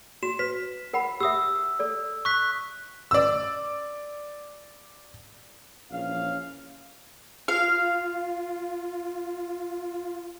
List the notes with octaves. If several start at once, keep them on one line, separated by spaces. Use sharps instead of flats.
F#4 E7
B4 B6
A#4 F#5 B5
G4 E5 D#6 E6
A4 D5
C#6 F#6 B6
D5 E6
A#1 E3 C#4 F5
F4 F5